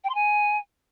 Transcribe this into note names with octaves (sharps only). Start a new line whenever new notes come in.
G5
C6
G#5